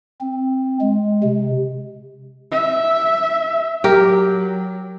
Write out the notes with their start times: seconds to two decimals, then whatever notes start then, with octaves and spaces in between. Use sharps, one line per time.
0.21 C4
0.81 G#3
1.23 C3
2.51 E5
3.84 F#3 G4 A#4